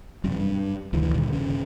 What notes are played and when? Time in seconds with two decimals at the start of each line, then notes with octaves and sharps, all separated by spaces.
0.24 E1 F#2 C3
0.36 G2
0.93 F1 D2 D#3 E3
1.14 G2 A#2 D3 D#3
1.33 F#1 C3 C#4